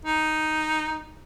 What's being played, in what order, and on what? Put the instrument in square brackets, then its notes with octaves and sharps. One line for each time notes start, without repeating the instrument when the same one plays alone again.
[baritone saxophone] D#4